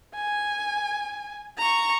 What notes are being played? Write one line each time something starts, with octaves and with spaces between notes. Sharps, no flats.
G#5
A#5 C#6